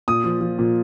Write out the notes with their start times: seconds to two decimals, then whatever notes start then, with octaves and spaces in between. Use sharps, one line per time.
0.08 A#2 D#6
0.24 F3
0.41 F3
0.59 A#2